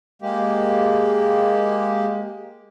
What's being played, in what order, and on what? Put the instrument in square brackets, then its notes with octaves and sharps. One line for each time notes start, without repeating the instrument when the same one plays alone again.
[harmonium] G#3 A#3 G4